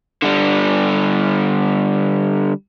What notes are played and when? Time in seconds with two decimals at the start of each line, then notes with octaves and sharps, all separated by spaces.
0.22 D3 G3